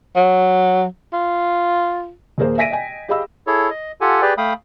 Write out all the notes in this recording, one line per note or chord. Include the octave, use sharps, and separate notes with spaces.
F#3
F4
D#1 A#2 A#3 G#4 A#4 C5
E5 G#5 A#6 B6 D7 D#7
D#5 G5 G#5
G4 G#4 D#5 F5 B5 E6
E4 G#4 A4 C#5
D#5
F4 G4 A4 F#5 G#5
G4 G#4 B4 D5 G5
A3 F5 G5 B5 D#6